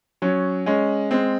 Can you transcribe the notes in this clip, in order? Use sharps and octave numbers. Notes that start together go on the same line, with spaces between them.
F#3 C#4
G#3 C#4
G#3 C4